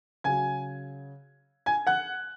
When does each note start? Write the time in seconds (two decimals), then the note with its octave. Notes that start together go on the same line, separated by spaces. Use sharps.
0.24 C#3 F#3 G#5 G#6
1.66 G#5 G#6
1.87 F#5 F#6